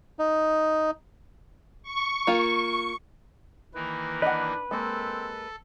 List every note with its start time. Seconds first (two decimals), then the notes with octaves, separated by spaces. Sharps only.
0.19 D#4
1.83 C#6
2.27 A#3 F4
3.75 D#3 E3 A#3 B4
4.22 D4 B4 D#5 F#5
4.71 G#3 A#3 C4 A4